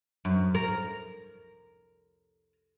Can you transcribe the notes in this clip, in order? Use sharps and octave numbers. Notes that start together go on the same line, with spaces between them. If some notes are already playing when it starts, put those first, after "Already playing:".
F#2
A#4